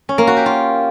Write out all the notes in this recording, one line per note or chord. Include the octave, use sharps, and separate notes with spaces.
C#4
A#3
F#4
G4
F4